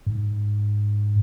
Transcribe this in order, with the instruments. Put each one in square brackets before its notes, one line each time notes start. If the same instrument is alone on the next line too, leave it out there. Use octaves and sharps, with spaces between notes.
[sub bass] G#2